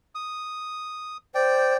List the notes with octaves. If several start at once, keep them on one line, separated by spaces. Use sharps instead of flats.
D#6
C5 D5 G5